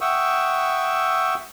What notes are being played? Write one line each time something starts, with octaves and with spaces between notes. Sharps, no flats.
E5 F#5 G5 C#6 D#6 E6